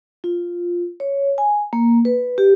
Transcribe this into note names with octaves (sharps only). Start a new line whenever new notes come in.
F4
C#5
G#5
A#3
B4
G4